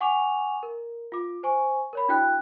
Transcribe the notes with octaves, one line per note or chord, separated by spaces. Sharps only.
F#5 G#5 C#6 D6 F7
A#4
F4 D6
C5 G#5 C#6
A#4 C#5 B5
D4 E4 F#4 G5 F#6